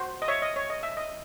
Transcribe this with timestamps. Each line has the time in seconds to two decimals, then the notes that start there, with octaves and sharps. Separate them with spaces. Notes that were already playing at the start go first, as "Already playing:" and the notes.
Already playing: F#4 C5
0.22 D#5
0.28 C#5 E5
0.42 D#5
0.56 C#5
0.70 D#5
0.83 E5
0.97 D#5